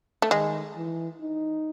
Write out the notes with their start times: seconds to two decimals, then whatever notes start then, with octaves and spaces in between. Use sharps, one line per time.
0.22 A3
0.31 D#3 G#3
0.76 E3
1.21 D#4